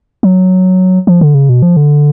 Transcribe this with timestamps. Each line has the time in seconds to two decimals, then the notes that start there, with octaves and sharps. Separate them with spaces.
0.23 F#3
1.07 F3
1.21 D3
1.35 C#3
1.49 B2
1.62 F3
1.77 D3